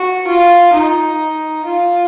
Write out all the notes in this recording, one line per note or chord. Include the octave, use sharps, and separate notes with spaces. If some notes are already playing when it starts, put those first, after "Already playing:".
Already playing: F#4
F4
D#4
F4